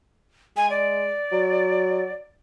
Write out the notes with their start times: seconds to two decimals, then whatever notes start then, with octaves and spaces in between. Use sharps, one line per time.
0.57 G#3 G#5
0.70 D5
1.32 F#3